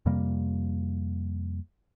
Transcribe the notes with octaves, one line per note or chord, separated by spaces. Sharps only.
F2 C3 G3 A#3